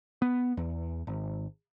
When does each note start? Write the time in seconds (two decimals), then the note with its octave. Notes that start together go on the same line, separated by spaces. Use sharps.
0.22 B3
0.57 E2
1.07 G#1